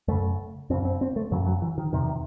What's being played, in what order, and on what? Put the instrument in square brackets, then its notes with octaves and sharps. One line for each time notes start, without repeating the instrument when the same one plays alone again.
[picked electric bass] F#2 C#3 A3
F#2 C4
C#3
C4
C4
A3
F#2 C#3 F#3
F#3
E3
D#3
E2 C3 D#3